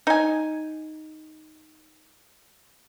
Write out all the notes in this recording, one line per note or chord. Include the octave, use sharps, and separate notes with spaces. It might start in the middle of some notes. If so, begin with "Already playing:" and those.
D#4 G#5